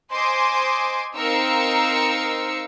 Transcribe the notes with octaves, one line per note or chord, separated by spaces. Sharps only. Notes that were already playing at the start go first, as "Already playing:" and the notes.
C5 D#5 G#5 C6 D6
C4 D#4 A#4 F5 E6 C#7